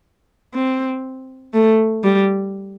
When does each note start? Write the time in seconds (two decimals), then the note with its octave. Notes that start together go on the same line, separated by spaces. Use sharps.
0.54 C4
1.54 A3
2.04 G3